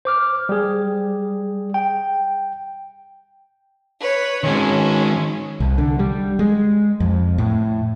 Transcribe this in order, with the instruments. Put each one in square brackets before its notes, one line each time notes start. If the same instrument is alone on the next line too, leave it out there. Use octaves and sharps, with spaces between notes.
[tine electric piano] C5 D6 F6
G3 G#4
G5
[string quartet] B4 C#5
[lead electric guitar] D#3 G#3 [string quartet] C#4
[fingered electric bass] C2
D3
G3
G#3
F2
A2